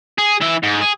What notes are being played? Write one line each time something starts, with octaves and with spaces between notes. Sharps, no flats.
G#4
E3 E5
G#2
G#4